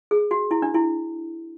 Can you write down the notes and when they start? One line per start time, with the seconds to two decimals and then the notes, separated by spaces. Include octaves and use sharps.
0.11 G#4
0.31 F#4
0.51 E4
0.62 D4
0.74 E4